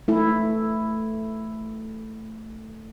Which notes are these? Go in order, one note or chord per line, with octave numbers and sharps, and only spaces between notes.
A3 E4